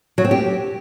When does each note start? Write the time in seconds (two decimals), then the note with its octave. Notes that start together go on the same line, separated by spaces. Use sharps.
0.18 F#3
0.24 C4
0.31 G4